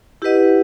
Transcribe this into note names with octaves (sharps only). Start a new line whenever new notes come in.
E4 G4 B4 D#5 F#5